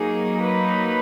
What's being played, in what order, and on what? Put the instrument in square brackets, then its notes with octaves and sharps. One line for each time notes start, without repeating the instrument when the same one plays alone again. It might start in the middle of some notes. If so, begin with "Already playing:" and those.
Already playing: [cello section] F#3 A#3 D#4 G#4
B4